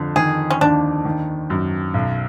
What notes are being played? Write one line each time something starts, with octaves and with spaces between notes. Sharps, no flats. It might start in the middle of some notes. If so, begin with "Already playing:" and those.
Already playing: F2 D3
D#3 G#4
C#4
D#2 D4
D#3
F#2
B1